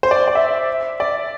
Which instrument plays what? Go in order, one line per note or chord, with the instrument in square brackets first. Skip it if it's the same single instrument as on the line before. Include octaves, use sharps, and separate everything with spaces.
[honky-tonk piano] C5
D5
D5
E5
D5